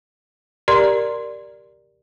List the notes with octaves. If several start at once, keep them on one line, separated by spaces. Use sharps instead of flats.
G4 A#4 D5 A#5 C6